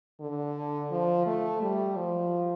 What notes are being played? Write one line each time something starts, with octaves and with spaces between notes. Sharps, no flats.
D3
F3
A3
G3
F3